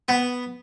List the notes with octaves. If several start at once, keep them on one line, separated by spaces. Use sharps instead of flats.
B3